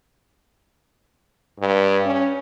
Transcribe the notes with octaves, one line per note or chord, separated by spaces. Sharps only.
G2
C#4